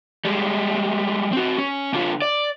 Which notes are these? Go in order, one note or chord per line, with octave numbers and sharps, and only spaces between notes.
G3 G#3
C4 F#4
C#4
D3 F4
D5